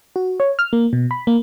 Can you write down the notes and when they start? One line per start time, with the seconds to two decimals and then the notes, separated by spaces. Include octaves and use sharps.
0.16 F#4
0.40 C#5
0.59 F6
0.73 A#3
0.93 B2
1.11 B5
1.27 A#3